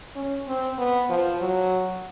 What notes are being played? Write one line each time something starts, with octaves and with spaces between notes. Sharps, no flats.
C#4
C4
B3
F3
F#3